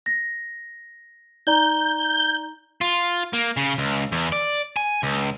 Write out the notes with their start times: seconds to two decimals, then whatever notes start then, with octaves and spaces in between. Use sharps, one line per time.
0.06 A#6
1.47 D#4 D5 A#5 G6
2.81 F4
3.33 A#3
3.57 C#3
3.78 C#2
4.12 E2
4.32 D5
4.77 G#5
5.03 C#2